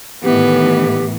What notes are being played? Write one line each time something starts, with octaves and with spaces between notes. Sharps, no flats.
A2 D#3 E3 B3 G4